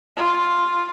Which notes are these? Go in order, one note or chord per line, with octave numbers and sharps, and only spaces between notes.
F4